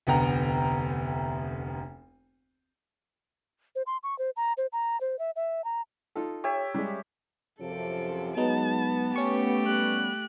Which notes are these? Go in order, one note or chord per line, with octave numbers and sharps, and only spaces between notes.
F1 D2 B3 G5 A#5
C5
C6
C#6
C5
A#5
C5
A#5
C5
E5
E5
A#5
D#4 F4 A4
G4 C#5 E5
G3 G#3
F#2 C3 F3 A4 D7
F#3 G#3 B3 D#4 A5
A3 C#4 G4 C#6
G3 B3 F#6